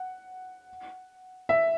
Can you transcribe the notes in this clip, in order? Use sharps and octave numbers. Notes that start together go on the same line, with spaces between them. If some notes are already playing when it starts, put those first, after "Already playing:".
Already playing: F#5
E5